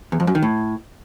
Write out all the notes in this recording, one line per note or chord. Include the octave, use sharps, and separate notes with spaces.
E2
F2
F#2
D#3
A2